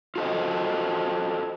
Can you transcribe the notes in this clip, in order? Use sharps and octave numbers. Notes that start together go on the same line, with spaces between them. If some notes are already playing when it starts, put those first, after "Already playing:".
F4 F#4 A4 A#4 C5 D#5